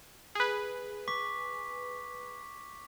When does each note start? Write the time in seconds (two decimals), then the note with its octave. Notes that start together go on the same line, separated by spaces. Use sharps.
0.35 G#4 B4
1.08 C#6 D6 B6